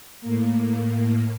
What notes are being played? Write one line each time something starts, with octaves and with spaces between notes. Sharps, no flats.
A2 A#3